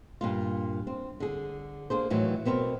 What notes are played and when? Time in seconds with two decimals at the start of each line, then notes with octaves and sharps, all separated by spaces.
0.21 G2 A#2 F4
0.87 C4
1.20 D3 G#4
1.90 A#3 D4 G#4 C5
2.10 A2 D#3 E3 F#3
2.45 B2 B3 C4 A#4